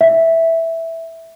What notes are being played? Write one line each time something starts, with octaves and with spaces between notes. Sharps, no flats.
E5